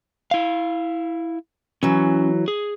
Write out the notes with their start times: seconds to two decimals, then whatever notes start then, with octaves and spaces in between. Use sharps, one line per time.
0.31 E4 F5
1.83 E3 F#3 C#4
2.48 G#4